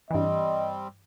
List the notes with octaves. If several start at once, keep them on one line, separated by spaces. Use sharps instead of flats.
G2 E3 G3 C4 D#5